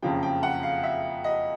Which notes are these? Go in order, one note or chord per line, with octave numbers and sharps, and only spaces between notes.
F#1 F2 C#3 F3 G5
G5
F#5
F5
E5
D#5